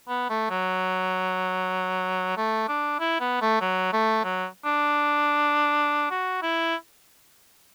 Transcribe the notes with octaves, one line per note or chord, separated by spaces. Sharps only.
B3
A3
F#3
A3
D4
E4
B3
A3
F#3
A3
F#3
D4
F#4
E4